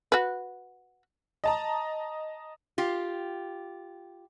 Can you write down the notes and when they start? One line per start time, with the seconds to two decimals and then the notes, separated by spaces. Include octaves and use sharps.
0.12 F#4 B4
1.44 D#5 A5 A#5
2.78 F4 G4